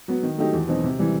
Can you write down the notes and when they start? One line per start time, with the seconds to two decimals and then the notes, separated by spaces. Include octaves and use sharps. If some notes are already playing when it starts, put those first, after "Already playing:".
0.08 F#3 B3
0.23 D#3
0.38 F#3 A3 D#4 G4
0.53 E2
0.68 B2 F#3 C4 D#4
0.84 C3
0.99 E3 G3